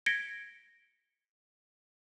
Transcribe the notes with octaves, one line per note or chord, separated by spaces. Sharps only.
G#6 A#6 B6 C#7 D7 G7